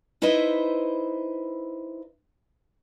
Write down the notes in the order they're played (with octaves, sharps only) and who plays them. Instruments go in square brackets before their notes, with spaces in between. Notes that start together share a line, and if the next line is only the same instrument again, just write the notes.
[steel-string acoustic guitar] D#4 E4 B4 C5 D#5 E5